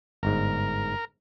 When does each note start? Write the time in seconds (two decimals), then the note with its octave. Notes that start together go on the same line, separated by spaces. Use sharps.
0.23 G1 G#2 A#4